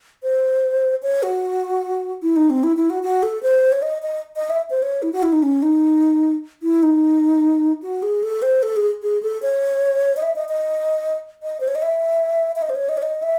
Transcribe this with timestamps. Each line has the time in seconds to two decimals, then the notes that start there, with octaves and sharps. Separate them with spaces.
0.23 C5
1.03 C#5
1.23 F#4
2.23 E4
2.36 D#4
2.50 C4
2.63 E4
2.77 E4
2.90 F#4
3.03 F#4
3.23 A4
3.43 C5
3.72 C#5
3.82 D#5
4.02 D#5
4.36 D#5
4.50 E5
4.70 C5
4.82 C#5
5.02 E4
5.13 F#4
5.23 E4
5.32 D#4
5.42 C#4
5.62 D#4
6.63 E4
6.83 D#4
7.82 F#4
8.02 G#4
8.23 A4
8.42 C5
8.63 A4
8.76 G#4
9.02 G#4
9.22 A4
9.42 C#5
10.17 D#5
10.22 E5
10.36 D#5
10.49 D#5
11.43 D#5
11.60 C5
11.68 C#5
11.75 D#5
11.82 E5
12.56 E5
12.62 D#5
12.70 C5
12.75 C#5
12.89 D#5
12.97 C#5
13.02 D#5
13.22 E5